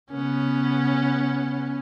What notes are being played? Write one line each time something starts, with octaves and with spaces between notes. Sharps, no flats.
C#3 B3 C#4